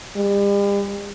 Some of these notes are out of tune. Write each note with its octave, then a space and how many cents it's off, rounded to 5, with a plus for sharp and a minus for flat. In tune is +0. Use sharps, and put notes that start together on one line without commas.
G3 +40